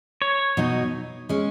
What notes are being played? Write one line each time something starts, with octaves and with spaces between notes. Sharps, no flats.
C#5
B2 F#3 D#4
G#3 C#4